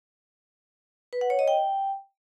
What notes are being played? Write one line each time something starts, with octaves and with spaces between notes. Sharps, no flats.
B4
F#5
C#5
D#5
G5